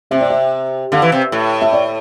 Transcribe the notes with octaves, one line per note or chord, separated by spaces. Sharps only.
C3 E5
D5
E5
D3 F5
E3
C3
A2
E5
D5